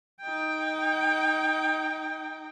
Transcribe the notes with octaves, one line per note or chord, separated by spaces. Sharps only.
D#4 G5